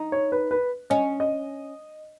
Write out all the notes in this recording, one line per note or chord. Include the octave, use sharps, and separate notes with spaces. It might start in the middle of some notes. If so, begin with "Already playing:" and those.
Already playing: D#4
C#5
B4
B4
C#4 D#5
D#5